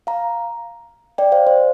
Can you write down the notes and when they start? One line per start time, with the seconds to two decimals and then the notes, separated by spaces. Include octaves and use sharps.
0.07 F5 A#5
1.18 D5 G5
1.32 C5 F5
1.47 C5